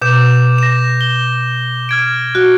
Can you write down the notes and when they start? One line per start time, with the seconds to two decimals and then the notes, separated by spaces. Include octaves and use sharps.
0.02 B2 D6 G6 E7
0.58 A#6 E7
1.01 G7
1.89 F6 G#6 D7
2.35 F#4